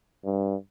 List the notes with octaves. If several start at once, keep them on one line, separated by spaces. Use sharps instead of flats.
G2